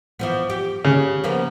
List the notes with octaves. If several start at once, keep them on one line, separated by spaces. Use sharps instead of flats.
E3 F3 B3
G4
C#3
F3 A#3 B3